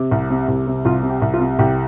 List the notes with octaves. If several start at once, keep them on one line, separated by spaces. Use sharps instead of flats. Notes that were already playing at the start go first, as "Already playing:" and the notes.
Already playing: C3
C2
C3
C2
C3
C2 F4
C3
G4
C2
F4
C3
C2 G4